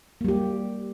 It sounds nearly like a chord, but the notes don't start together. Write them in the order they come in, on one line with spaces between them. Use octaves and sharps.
A#3 G3 G4